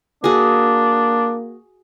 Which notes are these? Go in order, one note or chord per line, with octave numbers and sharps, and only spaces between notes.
A#3 D4 F#4 G#4